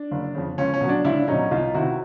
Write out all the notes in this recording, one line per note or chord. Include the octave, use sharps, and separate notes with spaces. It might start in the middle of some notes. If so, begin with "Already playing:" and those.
Already playing: D4
F#1
F2 C#3
C#2 C#4
C#4
B2 F#3
D4
C#2 D4 E4
B2 F#3 C#4 D#4
C2 D#4 F4
C3 D#3 E4 F#4